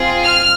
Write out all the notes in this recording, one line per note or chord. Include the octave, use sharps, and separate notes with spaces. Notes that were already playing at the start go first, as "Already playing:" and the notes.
Already playing: C4 F4 G#4
F6